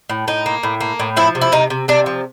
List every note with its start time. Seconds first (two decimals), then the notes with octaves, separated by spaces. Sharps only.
0.10 A2
0.28 A2 D#4
0.46 A#3
0.63 A2
0.81 A#3
1.00 A2
1.16 F3 E4
1.35 C3
1.41 E4
1.52 C3 D#4
1.70 C3
1.88 C3 D4
2.06 F3